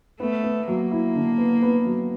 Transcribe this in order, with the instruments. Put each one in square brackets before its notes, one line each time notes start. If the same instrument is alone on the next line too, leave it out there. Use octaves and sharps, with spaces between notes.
[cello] A3 [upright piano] B3
[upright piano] B3
[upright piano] F#3 [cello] A#3
[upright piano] E4
D3
B3
B3
F#3